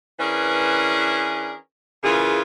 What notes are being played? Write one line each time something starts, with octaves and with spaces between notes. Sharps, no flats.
E3 C#4 D4 G#4 A#4 B4
C#3 E3 A#3 F4 G#4